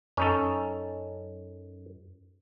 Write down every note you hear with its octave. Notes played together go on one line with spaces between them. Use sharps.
F#2 C#4 D#4 A4